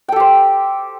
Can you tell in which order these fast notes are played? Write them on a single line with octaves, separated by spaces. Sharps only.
G5 A4 G4 C5